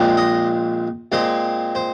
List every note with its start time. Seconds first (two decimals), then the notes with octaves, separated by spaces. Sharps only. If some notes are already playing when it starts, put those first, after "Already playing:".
Already playing: A#1 A#2 G#3 C4
0.17 D#5
1.12 A#2 G#3 C4
1.75 C5